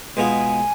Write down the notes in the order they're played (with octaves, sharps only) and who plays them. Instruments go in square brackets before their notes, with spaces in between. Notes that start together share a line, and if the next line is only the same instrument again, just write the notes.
[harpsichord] B2 G#3 B3 F4 G#4 [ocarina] G#5